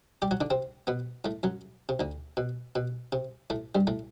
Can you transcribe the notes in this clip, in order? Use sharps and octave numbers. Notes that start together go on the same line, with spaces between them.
G3 G4
F#3 F#4
D3 D4
C3 C4
B2 B3
A2 A3
F#2 F#3
C3
D2 D3
B2
B2
C3
A2 A3
G2 G3
A2 A3